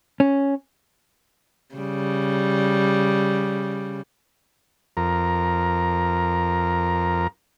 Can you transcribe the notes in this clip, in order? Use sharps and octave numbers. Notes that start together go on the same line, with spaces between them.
C#4
C#3 G3
F2 A#4